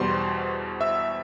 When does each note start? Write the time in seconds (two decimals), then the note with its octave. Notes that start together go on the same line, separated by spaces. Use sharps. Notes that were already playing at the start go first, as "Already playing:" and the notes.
Already playing: E2 B2 G3 C5 C6
0.81 E5 E6